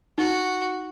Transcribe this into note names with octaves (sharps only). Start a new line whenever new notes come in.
D#4 F#4